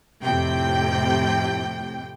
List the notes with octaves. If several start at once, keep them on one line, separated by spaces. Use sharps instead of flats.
F2 A2 C3 G5